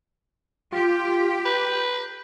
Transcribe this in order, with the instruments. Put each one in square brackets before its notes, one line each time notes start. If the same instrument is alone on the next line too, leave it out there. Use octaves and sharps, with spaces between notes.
[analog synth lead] F4 [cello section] G4
[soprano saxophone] B4 [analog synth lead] G6